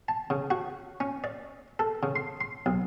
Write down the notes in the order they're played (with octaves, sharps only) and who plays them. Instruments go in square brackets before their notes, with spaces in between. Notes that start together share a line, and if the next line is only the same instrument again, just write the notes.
[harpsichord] A5
C#3
F#4
C#4
D5
A4
C#3
C6
C6
B1